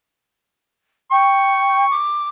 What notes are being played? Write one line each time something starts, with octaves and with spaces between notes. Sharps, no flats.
G5 C#6
D6